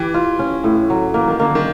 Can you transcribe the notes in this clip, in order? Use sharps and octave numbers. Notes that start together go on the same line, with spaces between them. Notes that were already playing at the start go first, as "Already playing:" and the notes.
Already playing: E3 G4 B4
F4
C#4
A2
F#3
E3 A#3
D#3
D3 A#3
D#3